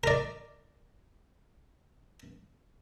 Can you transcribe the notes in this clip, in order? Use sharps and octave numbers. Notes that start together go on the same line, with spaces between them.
A#4 D5